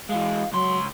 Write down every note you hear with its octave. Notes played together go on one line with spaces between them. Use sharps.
E3 G#3 F5
C#2 F#3 C6